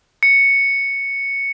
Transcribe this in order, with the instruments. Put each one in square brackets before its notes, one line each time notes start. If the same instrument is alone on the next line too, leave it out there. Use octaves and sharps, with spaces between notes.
[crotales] C#7